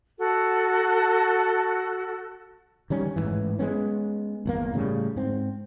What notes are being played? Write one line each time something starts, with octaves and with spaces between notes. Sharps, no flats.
F#4 A4
D#3 G3 C#4
A1 G#2 D3 E3
G#3 A3 B3 C#4
G1 E2 A#3
A2 C#3 G3
G#2 C4